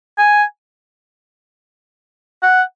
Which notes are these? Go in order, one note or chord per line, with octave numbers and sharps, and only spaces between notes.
G#5
F#5